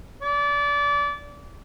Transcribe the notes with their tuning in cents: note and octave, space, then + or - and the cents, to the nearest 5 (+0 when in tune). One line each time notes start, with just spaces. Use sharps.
D5 -25